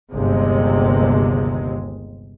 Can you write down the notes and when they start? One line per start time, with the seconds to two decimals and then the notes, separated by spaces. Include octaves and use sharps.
0.11 G1 D#2 C3 G#3